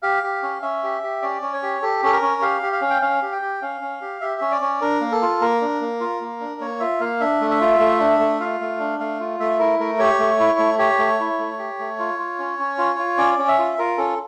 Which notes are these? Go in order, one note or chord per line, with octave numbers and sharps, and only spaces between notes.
G4 F5
G4
C#4
C#4 E5
G4
G4
C#4 D5
C#4
C#5
G4
G4 A4
C#4 A4
A#4
C#4
G4 F5
G4
F5
C#4
G5
C#4 F5
G4
G5
G4
C#4 F5
C#4
G4
G4 E5
C#4
D5
C#4
D4 A#4
A#3
A4
F4
A#3 A#4
D4
A#3
F4
A#3
D4
A#3 C#5
F4 E5
A#3 F5
D4 E5
A3
E5
F4
A3
D4
A3
F4 F5
A3
D4
A3 F5
F4
A3 E5
E4 A#4
A3 A#4
G4 C#5
A3
E4
A3
G4 C#5
A3
E4
A3
G4
A3
F4
F4
C#4
C#4
F4
F4
C#4 D5
C#4
E5
F4
F4 A#4
C#4 A4